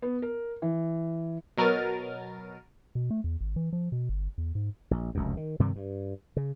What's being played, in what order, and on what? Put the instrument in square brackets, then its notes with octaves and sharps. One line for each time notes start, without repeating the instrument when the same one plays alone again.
[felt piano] B3
A#4
E3
[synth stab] B2 F#3 A#4 F6 A6 D#7
[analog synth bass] B2
A3
E2
G#1
E3
F3
B2
G1
E2
G#2
[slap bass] A#1
F1 C#2 F#2
D#3
G2 C3 D#3 G3
G2
C#3